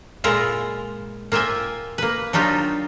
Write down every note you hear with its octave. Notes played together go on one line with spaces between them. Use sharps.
A#2 G#3 E4 F4 A#5
A#3 F4 E5 G5 G#5
A#3 B4
F#3 D4 D#4 F4 G4